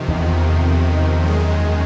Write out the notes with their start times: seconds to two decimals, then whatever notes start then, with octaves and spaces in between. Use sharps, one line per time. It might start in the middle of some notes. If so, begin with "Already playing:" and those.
Already playing: F2 C3 D#3
0.09 E2
1.23 F#2 D#3 G#3